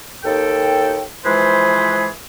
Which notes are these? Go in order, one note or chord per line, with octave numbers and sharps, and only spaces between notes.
D#2 A4 G5
E3 F3 G#3 G#4 B4 C5